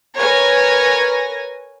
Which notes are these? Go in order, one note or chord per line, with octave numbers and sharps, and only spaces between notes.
A#4 B4 C#5 G#5 A#6